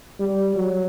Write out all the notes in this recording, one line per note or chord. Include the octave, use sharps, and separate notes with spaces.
G3
F#3